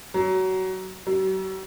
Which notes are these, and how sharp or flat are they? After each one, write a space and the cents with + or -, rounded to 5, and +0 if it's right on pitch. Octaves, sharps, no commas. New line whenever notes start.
F#3 +20
F#3 +40